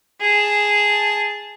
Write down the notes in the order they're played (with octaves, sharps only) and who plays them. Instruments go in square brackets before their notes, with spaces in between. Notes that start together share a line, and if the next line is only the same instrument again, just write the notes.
[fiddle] G#4 A5